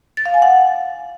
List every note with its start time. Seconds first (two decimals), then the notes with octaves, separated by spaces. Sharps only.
0.17 A6
0.26 F5
0.34 G#5
0.42 F#5